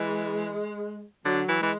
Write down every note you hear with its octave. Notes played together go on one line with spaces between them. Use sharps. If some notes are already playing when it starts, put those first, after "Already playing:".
Already playing: E3 G#3
D3 F#3
E3
E3 G#3